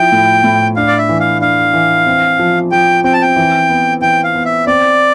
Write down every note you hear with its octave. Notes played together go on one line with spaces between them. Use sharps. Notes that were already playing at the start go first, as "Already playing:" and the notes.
Already playing: F3 E4 G5
A2
A2
D4 F5
D5
E5
E3
F5
D4 F5
E3
C4
F3
F3 G5
C4 G5
A5
G5
E3
B3
E3 G5
F5
B3
E5
C4 D5